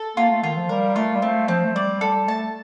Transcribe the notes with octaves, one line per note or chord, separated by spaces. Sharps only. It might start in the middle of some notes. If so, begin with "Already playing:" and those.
Already playing: A4
A#3 F4
A3
D#3 F4
F3
G3 A#4
A3 F4
G3
A3 C4
F3 C4
A3
G3 D5
G3 A4
A3 A5